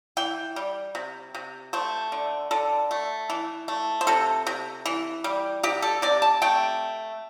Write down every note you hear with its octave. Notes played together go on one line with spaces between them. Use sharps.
E3 G5
G3
C3
C3
A3 C5
D3
D3 A4
A3
E3
A3
C5
C3 A4
C3
E3
G3
C3 G4
A4
C3 D5
A5
A3 G5